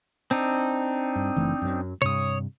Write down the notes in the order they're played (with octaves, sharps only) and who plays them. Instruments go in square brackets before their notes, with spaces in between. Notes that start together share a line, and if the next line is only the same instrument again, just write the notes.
[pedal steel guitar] C4 D4 D#4
[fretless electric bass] G2
F#1 E3 A3
F#2 F#3
[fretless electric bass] G2 C3 [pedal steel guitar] C#5 D#6